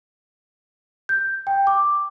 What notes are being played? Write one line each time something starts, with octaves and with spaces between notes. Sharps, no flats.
G6
G5
D6